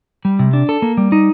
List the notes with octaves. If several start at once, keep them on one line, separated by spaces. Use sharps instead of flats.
G3
C3
D4
A4
A#3
G3
D#4